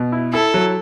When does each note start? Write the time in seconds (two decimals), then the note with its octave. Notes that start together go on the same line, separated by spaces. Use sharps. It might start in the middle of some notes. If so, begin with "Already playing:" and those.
Already playing: B2
0.12 E4
0.33 E4 A4
0.54 F#3